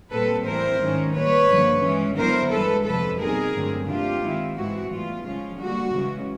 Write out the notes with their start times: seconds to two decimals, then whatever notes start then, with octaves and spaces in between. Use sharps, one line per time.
0.12 A#2 G3 C4 A4 B4
0.46 A2 E3 G3 C4 E4 A#4 C5
0.80 G#2 D#3 G#3 C#4
1.15 A#2 G3 A#3 B4 C#5
1.49 G2 D3 F3 A#3
1.83 E3 G#3 C#4
2.17 D3 F#3 B3 E4 A#4 C5
2.51 G2 E3 G#3 A4 B4
2.85 F2 C3 F3 A4 B4
3.19 B2 G3 C4 D#4 G#4 A#4
3.54 G2 D3 F#3 A3 C4
3.87 C3 E3 A3 D4 F4 G4
4.22 D#3 G#3 C4 E4
4.56 G#2 E3 G#3 C4 E4 F#4
4.90 A2 E3 G3 B3 F4
5.25 C#3 F3 G#3 C#4 F4
5.59 D3 G3 A#3 F#4
5.93 C#3 E3 G#3 C#4